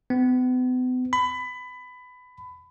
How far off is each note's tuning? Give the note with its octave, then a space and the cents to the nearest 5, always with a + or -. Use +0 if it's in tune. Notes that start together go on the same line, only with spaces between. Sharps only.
B3 +40
B5 +20